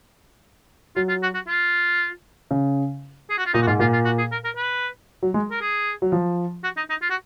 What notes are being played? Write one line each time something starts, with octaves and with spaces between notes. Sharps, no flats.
F#3 F4
F4
F#4
F#4
F4
C#3
G#4
F#4
F4
A#2 D#4
F#4
G#2 F4
A#2 F4
F4
F#4
G#4
A#4
A#4
B4
F#3
G#3
A#4
G#4
F#3
F3
F#4
D#4
D#4
F4
F#4